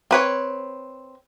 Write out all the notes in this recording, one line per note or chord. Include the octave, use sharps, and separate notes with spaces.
C4 B4 C#5